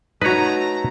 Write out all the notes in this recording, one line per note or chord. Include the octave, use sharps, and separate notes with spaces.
A3 D#4 F#4 B4 C#5 A#5